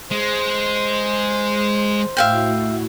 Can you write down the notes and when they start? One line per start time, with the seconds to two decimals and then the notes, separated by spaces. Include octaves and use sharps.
0.11 G#3 C5
2.17 A2 E4 F#4 E5 F5 G5